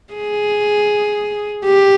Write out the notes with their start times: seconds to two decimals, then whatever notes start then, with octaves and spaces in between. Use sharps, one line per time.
0.14 G#4
1.65 G4